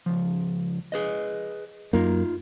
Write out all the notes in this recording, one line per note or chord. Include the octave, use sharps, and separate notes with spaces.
C#2 F3
G#4 B4 D#5
F#2 A#3 D#4 F4